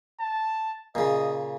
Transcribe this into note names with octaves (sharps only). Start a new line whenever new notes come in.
A5
A#2 C#3 D#5